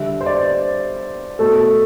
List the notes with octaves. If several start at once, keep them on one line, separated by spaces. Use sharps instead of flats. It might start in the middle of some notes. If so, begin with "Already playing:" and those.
Already playing: D3 G3 E5
C5
D5
B2 A3 A4